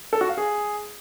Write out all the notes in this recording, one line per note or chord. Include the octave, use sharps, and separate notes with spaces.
A4
F#4
F5
G#4